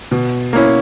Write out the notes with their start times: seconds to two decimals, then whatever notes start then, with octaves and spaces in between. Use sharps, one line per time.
0.11 B2
0.53 A#3 C#4 E4